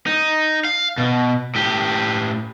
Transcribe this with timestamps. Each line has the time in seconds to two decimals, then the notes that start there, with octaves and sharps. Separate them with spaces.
0.07 D#4
0.65 F5
0.98 B2
1.55 A2 G4